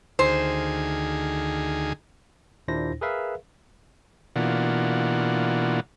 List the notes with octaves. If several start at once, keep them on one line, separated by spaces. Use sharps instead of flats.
D2 D#3 G#4 C5
D#2 A#2 D4 E4 C5 A#6
G#4 A#4 B4 E5 F5
B2 E3 A#3 D4 F4 F#4